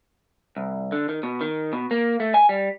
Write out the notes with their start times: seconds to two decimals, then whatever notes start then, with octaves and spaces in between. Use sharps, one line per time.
0.57 C2
0.92 D3
1.09 D#3
1.23 B2
1.41 D#3
1.73 B2
1.91 A#3
2.20 A3
2.34 G#5
2.49 G3